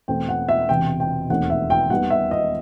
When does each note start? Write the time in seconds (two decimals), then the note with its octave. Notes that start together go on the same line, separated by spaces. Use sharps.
0.08 E2 B2 A3 C4 G5
0.29 F#5
0.49 E5
0.69 E1 E2 C3 G5
1.00 G5
1.30 E1 D#2 D#3 A3 C4 F#5
1.50 E5
1.70 G5
1.90 D#2 D#3 G3 B3 F#5
2.10 E5
2.31 D#5